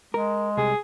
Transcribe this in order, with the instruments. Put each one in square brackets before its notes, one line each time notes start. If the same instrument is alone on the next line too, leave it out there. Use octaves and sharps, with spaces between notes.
[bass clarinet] G#3 [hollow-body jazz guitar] A#4
[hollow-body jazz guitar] C2 [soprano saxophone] G#4